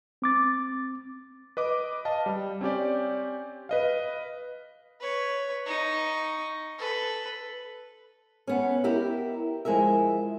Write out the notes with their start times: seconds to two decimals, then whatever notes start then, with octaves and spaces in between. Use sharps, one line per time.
0.22 C4 D6 A6
1.57 B4 D#5 D6
2.05 D#5 F5 A5
2.26 G3
2.61 C4 C#4 G4 D5
3.69 B4 D#5 F5
5.00 B4 C#5
5.66 D#4 C#6
6.78 A4 B4
8.47 B3 C#4
8.84 E4 G4 A#4 D#5 E5
9.65 F3 G#3 E4 A#4 E5